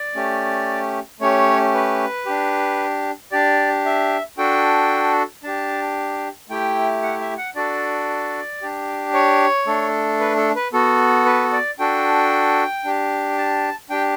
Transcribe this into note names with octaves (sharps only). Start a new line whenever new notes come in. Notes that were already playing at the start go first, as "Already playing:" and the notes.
Already playing: D5
A3 C#4 G4
A3 C#4 G4 C#5
B4
D4 G4
D4 G4 D5
E5
D4 F#4 A4 G5
D4 G4 A5
A3 E4 G4 G5
F#5
E5
F#5
D4 F#4 A4 D5
D4 G4
C#5
A3 D4 A4
B4
A4
B4
B3 F#4 A4
B4
D5
D4 F#4 A4 G5
D4 G4
A5
D4 G4 G5